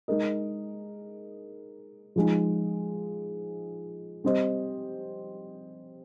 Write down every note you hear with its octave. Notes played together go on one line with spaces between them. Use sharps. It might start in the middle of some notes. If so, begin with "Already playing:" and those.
G#3 D#4 A#4 D#5
F3 G#3 D#4
G3 C4 G4 C5 D#5